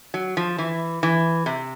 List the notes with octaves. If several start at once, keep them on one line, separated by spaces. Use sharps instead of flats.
F#3
F3
E3
E3
C3